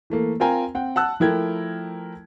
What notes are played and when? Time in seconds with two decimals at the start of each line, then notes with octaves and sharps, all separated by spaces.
0.10 E3 A3 A#3
0.40 C4 F4 A#4 G5 G#5 A#5
0.75 C4 F#5 G5
0.96 F#5 A5 E6 F#6
1.20 F3 A3 E4 A#4 G5 G#6